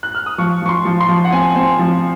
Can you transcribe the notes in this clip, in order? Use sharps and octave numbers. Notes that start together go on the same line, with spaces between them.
F#6
F6
D#6
F3 C#6
F3 C#6
C6
F3
C6
F3
F#5
C4 G#5
C4
F3